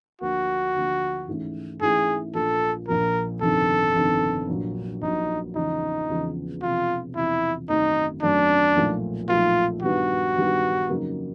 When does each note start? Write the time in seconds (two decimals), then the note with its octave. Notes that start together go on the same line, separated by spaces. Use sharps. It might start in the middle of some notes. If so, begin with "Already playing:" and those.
0.21 D2 D3 F3 A#3 F#4
0.75 D2 D3 F3 A#3
1.28 G#2 E3 A3 C#4 E4
1.81 G#2 E3 A3 C#4 E4 G#4
2.34 A#1 A#2 F3 A4
2.88 A#1 A#2 F3 A#4
3.41 G1 F2 C3 D#3 A4
3.95 G1 F2 C3 D#3
4.49 A#1 A#2 F#3
5.02 A#1 A#2 F#3 D#4
5.55 E2 C#3 F3 G#3 D#4
6.09 E2 C#3 F3 G#3
6.62 E1 E2 C3 F3 F4
7.15 E1 E2 C3 F3 E4
7.69 G#1 F#2 D#3 F#3 A3 D#4
8.22 G#1 F#2 D#3 F#3 A3 D4
8.76 B1 A#2 F3 A3
9.29 B1 A#2 F3 A3 F4
9.82 G2 D#3 G3 B3 F#4
10.36 G2 D#3 G3 B3
10.90 F2 C#3 F#3 A#3 D#4